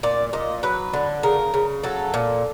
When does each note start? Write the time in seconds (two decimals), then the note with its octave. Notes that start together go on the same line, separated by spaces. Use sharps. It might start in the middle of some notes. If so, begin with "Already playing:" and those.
0.03 A#2 D5
0.33 A#2 D#5
0.63 F#3 B4
0.93 D3
1.23 C#3 A#4
1.54 C#3
1.83 F#3 A4
2.14 A#2